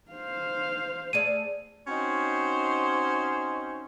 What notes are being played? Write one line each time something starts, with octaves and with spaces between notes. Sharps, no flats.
C5 F5
A3 G#4 D5 D#7
C4 C#4 D#4 F#4 C5